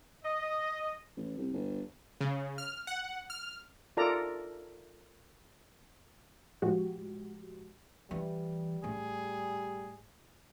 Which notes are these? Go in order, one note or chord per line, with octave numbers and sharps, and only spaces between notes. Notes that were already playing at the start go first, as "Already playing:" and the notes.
D#5
A1
C2
G1
C#3
F6
F#5
F6
F4 A4 A#4 D5 A#5
A2 F3 G#3 F#4 G4
E3 G3
A2 G#4